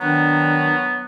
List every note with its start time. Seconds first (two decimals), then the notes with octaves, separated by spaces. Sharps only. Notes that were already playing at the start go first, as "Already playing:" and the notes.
0.01 D#3 F#3 B3 D4